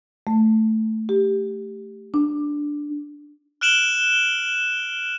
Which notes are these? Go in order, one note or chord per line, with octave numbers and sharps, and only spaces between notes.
A3
G4
D4
F6 F#6 D7 E7 F#7 G7